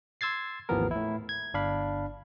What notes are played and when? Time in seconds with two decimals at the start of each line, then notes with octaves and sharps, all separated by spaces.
0.21 C6 E6 G#6 A6 C7
0.69 G#1 D#2 E3 F3 B3 A#4
0.91 A2 E4
1.29 G#6
1.54 G1 D4 F5 B5